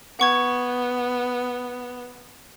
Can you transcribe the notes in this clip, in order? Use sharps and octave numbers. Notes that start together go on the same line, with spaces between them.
B3 F#5 C#6 G#6